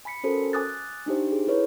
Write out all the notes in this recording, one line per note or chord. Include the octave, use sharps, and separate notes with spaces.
G#5 B5 B6 C#7
C#4 F#4 A4 A#4 C5
G#5 D6 D#6 F#6 A6
D4 D#4 G4 C5
G#4
E4 A4 B4 C#5